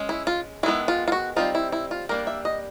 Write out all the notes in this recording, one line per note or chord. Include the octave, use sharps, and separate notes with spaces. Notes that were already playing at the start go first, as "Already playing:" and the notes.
Already playing: G#3 C#4
E4
F4
D#3 G#3 B3 E4
F4
F4
F#4
G3 C4 D#4 F4
E4
E4
F4
G3 A#3 D4 A#4
E5
D#5